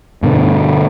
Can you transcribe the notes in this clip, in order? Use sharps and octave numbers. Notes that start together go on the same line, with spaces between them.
G2 B2 D3